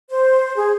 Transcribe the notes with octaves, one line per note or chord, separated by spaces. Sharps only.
C5
G#4